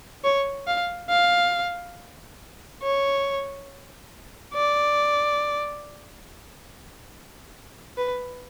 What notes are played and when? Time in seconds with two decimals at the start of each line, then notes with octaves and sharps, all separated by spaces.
0.24 C#5
0.67 F5
1.10 F5
2.82 C#5
4.54 D5
7.97 B4